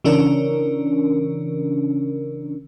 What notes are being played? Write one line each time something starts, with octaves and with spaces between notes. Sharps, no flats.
C#3 E3 C#4 D4 A#4